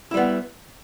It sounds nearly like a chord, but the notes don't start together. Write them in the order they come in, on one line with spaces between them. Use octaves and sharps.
E4 G3 B3